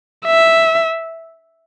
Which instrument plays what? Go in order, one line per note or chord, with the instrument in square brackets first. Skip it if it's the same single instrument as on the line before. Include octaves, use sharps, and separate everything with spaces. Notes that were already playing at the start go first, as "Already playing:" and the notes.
[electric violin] E5